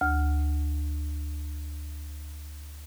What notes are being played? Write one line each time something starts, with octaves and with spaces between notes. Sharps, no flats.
D2 F6